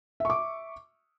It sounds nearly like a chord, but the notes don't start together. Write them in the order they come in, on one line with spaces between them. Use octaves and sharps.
E5 C#6 D6